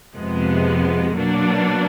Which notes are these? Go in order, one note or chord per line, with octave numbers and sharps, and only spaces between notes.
F2 C3 F3 G#3 B3
B2 F#3 A#3 D4